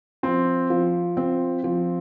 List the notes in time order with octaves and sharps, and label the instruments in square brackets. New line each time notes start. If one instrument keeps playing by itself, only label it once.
[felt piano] F3 [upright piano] C4
[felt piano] F3
C4
F3